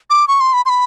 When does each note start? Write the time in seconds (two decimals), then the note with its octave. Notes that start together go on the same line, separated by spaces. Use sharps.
0.10 D6
0.28 C#6
0.40 C6
0.53 B5
0.66 C6
0.69 B5